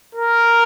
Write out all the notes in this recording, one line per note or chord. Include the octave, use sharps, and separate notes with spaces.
A#4